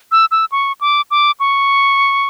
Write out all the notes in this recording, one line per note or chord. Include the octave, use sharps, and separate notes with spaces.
E6
E6
C#6
D6
D6
C#6